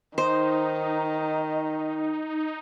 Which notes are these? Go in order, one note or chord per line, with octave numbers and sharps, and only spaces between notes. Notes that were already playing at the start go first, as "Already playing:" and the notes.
D#3 D#4 C5